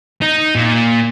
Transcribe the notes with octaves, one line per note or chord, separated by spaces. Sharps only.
D#4
A#2